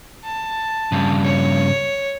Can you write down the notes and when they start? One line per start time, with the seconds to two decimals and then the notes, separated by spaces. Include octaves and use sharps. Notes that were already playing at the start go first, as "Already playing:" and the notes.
0.23 A5
0.92 G2 C#3
1.24 C#5